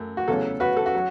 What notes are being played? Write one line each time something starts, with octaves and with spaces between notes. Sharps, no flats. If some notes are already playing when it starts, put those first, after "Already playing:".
Already playing: F#2 A3
F#4
E2 C#3 F#3 A3 C#4 A4
F#4 B4
A4
F#4
F#3